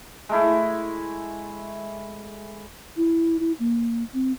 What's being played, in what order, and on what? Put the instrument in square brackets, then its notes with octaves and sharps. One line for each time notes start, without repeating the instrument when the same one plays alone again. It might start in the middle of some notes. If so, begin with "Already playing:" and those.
[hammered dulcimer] G#3 A3 E4
[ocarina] E4
E4
A#3
C4